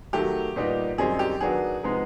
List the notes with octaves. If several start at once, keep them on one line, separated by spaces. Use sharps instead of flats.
D#3 F#3 A3 G4
A#2 G3 B3 D#4
F#2 D#3 G3 C4 D#4 G#4
G4
D#3 F#3 B3 D4 G#4
C3 F3 G#3 B3 D#4